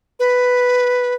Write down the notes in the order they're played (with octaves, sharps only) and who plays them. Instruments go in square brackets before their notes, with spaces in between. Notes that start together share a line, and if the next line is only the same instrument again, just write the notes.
[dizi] B4